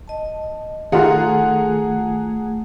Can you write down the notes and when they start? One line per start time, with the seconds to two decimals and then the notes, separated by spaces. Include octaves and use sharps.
0.08 D#5 A5
0.92 D#3 A3 F4 G#4 A4 F#5 A#5
1.60 A3